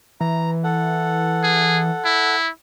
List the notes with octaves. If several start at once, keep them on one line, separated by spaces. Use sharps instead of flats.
E3 A#5
A4 F#5
G#4
E4